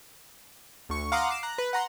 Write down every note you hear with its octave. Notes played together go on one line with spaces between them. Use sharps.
D2 C#6
F5 F#5 A#5 C6 D6 D#6
D6 C7 E7
A#5 F#6
B4
F#5 A#5 C6